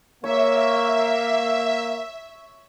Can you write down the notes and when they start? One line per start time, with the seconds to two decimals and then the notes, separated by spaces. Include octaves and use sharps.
0.24 A#3 C#5 E5